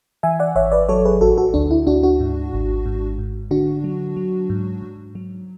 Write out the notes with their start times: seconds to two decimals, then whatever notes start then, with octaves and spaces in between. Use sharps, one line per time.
0.23 E3 E5 G#5
0.39 D5 F#5
0.55 G#1 C#5 E5
0.72 B4 D5
0.89 F#3 A4 C#5
1.05 G#4 B4
1.21 A1 F#4 A4
1.38 F#4 A4
1.54 D2 D4
1.71 E4
1.87 D2 D4 F#4
2.03 D4 F#4
2.20 G#2
2.53 G#1
2.86 G#2
3.18 G#2
3.51 D3 D4 F#4
3.84 F#3
4.16 F#3
4.50 G#2
4.82 G#2
5.15 F#3